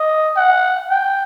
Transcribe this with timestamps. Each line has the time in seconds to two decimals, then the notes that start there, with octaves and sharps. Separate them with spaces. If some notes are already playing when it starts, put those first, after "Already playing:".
Already playing: D#5
0.36 F#5
0.90 G5